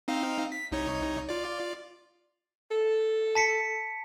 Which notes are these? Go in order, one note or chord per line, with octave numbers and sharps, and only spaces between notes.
C4 D#4 F5
B6
C2 D#4 C#5
F4 D5
A4
A5 B6 C#7